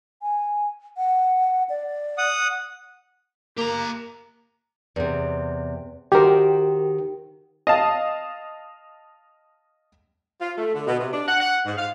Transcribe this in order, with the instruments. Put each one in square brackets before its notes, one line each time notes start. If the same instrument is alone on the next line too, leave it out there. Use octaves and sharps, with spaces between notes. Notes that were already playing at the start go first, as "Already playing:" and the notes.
[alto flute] G#5
F#5
D5
[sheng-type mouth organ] F#5 D#6
[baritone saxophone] A#3 [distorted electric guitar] G4 A#5
[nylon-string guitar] E2 C3
[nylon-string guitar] D#3 F#4 C5 [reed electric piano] G4 A#4
[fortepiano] D#5 F5 A5
[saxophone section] F4
A3
D3
B2
C3
D4
F#5
F#5
G#2
F5